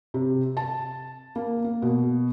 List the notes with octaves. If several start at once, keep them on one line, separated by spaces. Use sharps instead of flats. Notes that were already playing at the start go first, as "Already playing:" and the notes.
C3
A5
A#3
A#3
B2